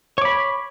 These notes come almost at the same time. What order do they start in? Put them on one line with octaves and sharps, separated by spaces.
C#5 D6 B5